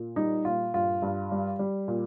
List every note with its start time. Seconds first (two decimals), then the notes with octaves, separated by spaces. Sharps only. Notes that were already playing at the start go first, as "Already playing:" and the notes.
Already playing: A#2
0.16 G3 D#4
0.45 A#2 F4
0.74 G2 F4
1.02 G2
1.32 G3
1.59 G3
1.88 A#2